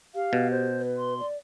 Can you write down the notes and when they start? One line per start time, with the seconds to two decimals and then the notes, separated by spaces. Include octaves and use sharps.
0.15 G4 F5
0.33 B2
0.51 C5
0.79 B4
0.97 C6
1.19 D5